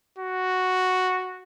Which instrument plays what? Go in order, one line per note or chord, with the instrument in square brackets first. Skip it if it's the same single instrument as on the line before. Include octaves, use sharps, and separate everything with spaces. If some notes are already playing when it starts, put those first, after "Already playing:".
[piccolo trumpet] F#4